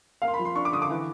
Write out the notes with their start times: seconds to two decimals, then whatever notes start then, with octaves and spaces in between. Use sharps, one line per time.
0.22 A#3 F5
0.28 C6
0.34 B5
0.39 F3
0.45 C6
0.56 D4 C#6
0.65 D6
0.73 D3 D#6
0.82 D6
0.90 E3